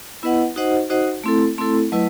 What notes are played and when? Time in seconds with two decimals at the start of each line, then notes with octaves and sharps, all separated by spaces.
0.23 B3 E4 B4 D#5 F#5
0.56 D#4 F#4 C5 D#5 F#5
0.90 D#4 F#4 C5 D#5 F#5
1.24 A3 C4 E4 A4
1.58 A3 C4 E4 A4
1.92 F#3 A3 E4 B4 D#5